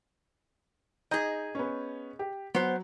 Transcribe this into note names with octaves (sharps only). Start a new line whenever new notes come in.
D#4 G#4 D#5 A#5 G6
B3 C#4
G4
F#3 B3 C5